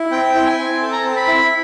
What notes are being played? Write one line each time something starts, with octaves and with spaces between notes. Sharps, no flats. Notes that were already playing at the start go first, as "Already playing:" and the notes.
Already playing: E4
C4 G5
E4
G#5
C4
A4 A5
A#5
C4 A5
B5
E4